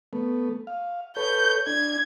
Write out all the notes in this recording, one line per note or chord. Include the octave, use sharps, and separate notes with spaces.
A3 B3
F5
A4 B4 C#5 G6
D4 G#6